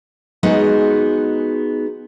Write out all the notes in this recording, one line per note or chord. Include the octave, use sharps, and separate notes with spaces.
G#3 B3 D#4 F#4 G#4